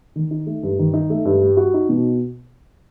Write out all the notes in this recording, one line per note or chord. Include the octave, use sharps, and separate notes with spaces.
D#3
D#4
A3
G2
D#3
D#4
A3
G2
G3
F#4
D#4
B2